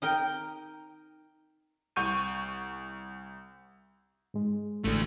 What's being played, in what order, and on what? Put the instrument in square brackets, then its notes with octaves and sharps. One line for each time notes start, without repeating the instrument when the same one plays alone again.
[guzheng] D#4 A#4 G5
[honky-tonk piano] C2 C#6 G6 D#7
[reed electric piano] G#2 G#3
[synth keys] A1 [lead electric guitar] D3 A3